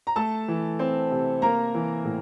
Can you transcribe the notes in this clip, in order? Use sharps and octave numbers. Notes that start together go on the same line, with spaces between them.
A#5
A3 A4 A5
E3
C4
C3
A#3 A#4 A#5
E3
A2